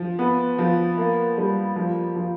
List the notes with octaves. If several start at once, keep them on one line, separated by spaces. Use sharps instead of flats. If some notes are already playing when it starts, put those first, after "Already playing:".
Already playing: F3
B3
F3
A#3
G3
F3
F3